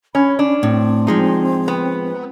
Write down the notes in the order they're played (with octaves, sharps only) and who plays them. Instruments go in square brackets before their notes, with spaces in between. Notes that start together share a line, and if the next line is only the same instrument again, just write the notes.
[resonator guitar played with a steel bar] C#4 [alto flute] B5
[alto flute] C#4 [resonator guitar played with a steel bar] D4
[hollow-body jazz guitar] A2 [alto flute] C4
[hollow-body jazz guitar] F3 G#3 D#4
[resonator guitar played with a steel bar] B3